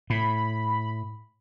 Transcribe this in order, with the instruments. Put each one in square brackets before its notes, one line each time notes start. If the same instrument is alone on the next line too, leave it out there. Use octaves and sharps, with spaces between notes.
[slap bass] A2 [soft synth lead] B5